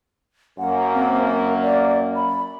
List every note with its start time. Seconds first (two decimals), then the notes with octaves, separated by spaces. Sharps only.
0.59 F#2 A#3 F#5
0.94 C4
1.25 A#4
1.62 D5
2.16 B5